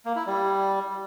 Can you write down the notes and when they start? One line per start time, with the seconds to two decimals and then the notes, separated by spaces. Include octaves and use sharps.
0.05 A#3
0.16 E4
0.26 G3